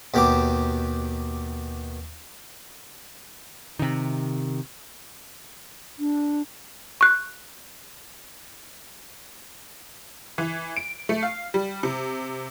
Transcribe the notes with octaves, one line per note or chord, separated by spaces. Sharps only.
D#2 B2 G4 A#5 D6
C3 D#3
D4
C#6 F#6
E3
D7
A3
F5
G3
C3